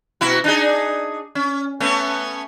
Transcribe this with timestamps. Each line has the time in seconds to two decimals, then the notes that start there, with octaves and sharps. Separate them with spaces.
0.21 B2 E4 F#4
0.44 D4 D#4 G#4
1.35 C#4
1.80 A3 B3 C#4